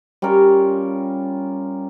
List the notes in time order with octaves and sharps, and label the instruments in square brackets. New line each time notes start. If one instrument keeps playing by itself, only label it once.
[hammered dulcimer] G3 C#4 F4 A#4